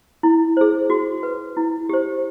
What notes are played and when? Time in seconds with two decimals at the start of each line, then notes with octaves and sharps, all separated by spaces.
0.23 E4
0.57 G#4 C5
0.90 F#4
1.23 B4
1.57 E4
1.89 G4 C5